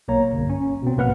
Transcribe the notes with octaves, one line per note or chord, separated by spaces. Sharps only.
B1 A#3 C#5 A#5
G1
C#4
B2 C4
A#1 G#2 A#3 B4 F#5 F6